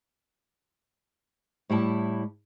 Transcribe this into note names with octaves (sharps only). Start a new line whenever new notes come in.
A2 G3 E4 A5